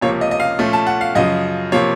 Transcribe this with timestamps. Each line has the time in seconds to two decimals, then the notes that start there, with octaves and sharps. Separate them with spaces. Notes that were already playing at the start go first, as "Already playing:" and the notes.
0.01 C#2 C3 F3 A#3 C#5
0.21 D#5
0.31 D#5
0.40 F5
0.59 A#2 F3 A3 C#4
0.73 A5
0.87 F#5
1.01 F5
1.15 F#2 C#3 F3 D#5
1.72 C3 F3 A#3 C#5